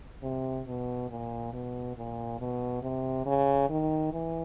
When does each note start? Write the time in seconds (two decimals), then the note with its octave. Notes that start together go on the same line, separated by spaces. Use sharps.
0.23 C3
0.67 B2
1.10 A#2
1.53 B2
1.97 A#2
2.40 B2
2.83 C3
3.26 C#3
3.70 D#3
4.12 E3